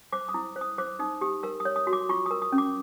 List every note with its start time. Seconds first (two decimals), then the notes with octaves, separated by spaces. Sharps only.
0.12 C5 D6
0.29 D#6
0.34 E4
0.56 C5
0.61 D#6
0.78 C5 D6
0.99 D#4 D#6
1.21 G4 D#6
1.43 A#4 E6
1.60 D#6
1.65 C#5
1.76 D#6
1.87 F#4
1.93 D6
2.09 F4 C#6
2.26 A#4 D#6
2.42 D#6
2.52 C#4
2.58 D6